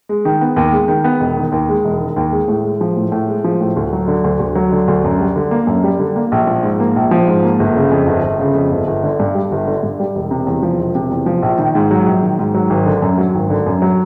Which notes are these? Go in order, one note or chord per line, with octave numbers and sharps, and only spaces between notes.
G#3
D#3
B3
D#2
G#3
D#3
B3
E1
D#3
D#2
G#3
E1
D#3
D#2
G#3
A2
G#3
F3
A2
A2
G#3
F3
A2
D2
F#3
D3
D2
D2
F#3
D3
D2
F#2
G3
D3
A#3
F#2
G3
D3
A#3
A#1
F3
G#2
A#3
A#1
F3
G#2
A#3
G1
C#3
F2
G1
G1
C#3
F2
G1
G1
D3
G2
G3
G1
D3
G2
G3
E1
C3
E2
F3
E1
C3
E2
F3
A#1
D#3
G#2
F#3
A#1
D#3
G#2
F#3
G#1
D3
F#2
F#3
G#1
D3
F#2
F#3